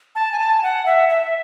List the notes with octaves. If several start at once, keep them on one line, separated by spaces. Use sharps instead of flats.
A5
G#5
A5
G#5
F#5
E5
E5